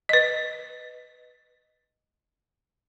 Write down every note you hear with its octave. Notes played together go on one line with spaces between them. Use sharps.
B4 D#5